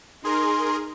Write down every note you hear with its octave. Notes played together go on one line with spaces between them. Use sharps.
D#4 G#4 A#4 C6